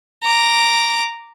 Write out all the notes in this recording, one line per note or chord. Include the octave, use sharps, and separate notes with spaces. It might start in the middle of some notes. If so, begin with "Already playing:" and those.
A#5 D6